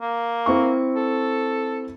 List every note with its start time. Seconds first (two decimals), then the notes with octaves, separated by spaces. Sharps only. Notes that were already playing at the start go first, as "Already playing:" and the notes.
0.01 A#3
0.46 C4 E4 C#6
0.96 A4